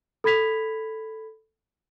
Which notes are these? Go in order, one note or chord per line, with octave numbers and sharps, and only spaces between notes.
A4 B5 G#6 B6 F7